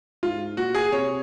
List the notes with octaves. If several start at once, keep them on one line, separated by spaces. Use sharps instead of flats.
G#2 F4
A#2 F#4
G#4
C3 C#5